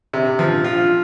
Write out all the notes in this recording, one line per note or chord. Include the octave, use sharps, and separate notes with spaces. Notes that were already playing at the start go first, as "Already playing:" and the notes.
C3
F3
F4